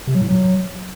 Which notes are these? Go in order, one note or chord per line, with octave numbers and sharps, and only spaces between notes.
C3
F#3
A2
F#3